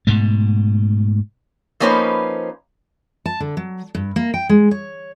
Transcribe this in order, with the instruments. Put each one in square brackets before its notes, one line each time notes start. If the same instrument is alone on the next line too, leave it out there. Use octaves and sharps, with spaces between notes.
[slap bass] G#2 B2 A3
[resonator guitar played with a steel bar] F3 A#3 C#4 D#4 B4 C5
[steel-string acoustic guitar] A5
D3
F#3
G2
A#3
G5
G#3
C#5